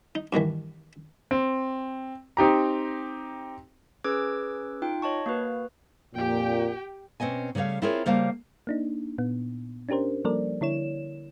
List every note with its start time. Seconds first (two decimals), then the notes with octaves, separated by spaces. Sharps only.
0.15 D#4
0.33 G2 B2 D#3 E3
1.31 C4
2.37 C4 D#4 G4 A#5
4.04 C#4 G#4 B4 D6 E6 G#6
4.82 D#4 F4 G5
5.02 C#5 D#5 A5 C#6
5.26 A#3 F#4 B4
6.15 F2 A#2 G4 G5
7.20 B2 C4 C#4 D#5 G#5
7.55 C#3 G3 A3 C#5 F5
7.82 C4 E4 F4 G#4 A#4 C#5
8.06 C#3 G3 A#3 C5 F5 A5
8.67 A#3 D4 D#4
9.18 A#2 B3
9.89 C#4 D4 G4 A#4 C5
10.25 F3 G3 A#3 A4 A#4 D5
10.61 D3 E4 C#5 E7